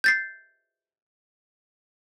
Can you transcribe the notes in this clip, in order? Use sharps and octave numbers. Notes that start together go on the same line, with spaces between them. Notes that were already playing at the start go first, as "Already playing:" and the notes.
G6 A6 C7